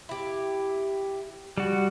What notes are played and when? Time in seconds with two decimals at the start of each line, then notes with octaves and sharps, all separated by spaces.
0.09 E4 G4
1.57 G3 F#4